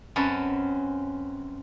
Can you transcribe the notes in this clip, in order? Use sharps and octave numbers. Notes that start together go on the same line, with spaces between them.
F#2 C4 C#4 B4 A5